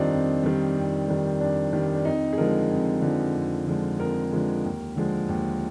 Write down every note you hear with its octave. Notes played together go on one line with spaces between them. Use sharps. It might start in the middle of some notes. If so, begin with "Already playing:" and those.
Already playing: F2 D#3 G3 C4 D4 D#4 F4
F2
D#3 G3
F2
D#3 G3
F2 D4
D#3 G3
D4
F2 D#4
G#4
D3 F3 G#3 A#4
F2
D3 F3 G#3
F2
D3 F3 G#3
F2 A#4
D3 F3 G#3
D#2
D3 F3 G#3
D#2